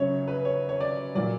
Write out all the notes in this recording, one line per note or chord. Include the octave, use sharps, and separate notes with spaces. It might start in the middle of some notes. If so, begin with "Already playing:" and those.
Already playing: F#2 C#3 F#3 C#5
B4
C#5
C#5
D5
A#2 F#3 D5